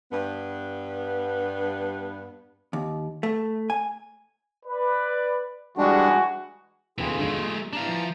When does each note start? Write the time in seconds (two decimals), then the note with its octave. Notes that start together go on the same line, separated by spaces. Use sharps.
0.12 G2 B3
2.73 D#2
3.23 A3
3.70 G#5
4.66 B4 D5
5.78 E3 G3 G#3 D4 F#4
6.98 D1 D#2 D3 E3 F4 G#4 G5
7.19 E1 G#2 D3 G#3 A3
7.34 G3 A#3
7.73 E3 D4 F5 A5 A#5
7.88 F3